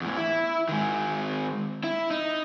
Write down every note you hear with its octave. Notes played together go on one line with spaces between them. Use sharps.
E2 A2
E4
D#3 G#3
E4
D#4